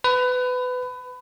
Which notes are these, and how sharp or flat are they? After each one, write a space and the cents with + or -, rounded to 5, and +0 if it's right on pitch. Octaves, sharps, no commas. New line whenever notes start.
B4 +25